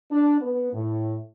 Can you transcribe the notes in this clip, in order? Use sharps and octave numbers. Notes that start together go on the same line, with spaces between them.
D4
B3
A2